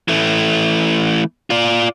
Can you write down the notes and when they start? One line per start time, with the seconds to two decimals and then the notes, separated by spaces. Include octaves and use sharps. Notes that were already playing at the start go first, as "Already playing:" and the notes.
0.08 E3 A3
1.50 F4 D5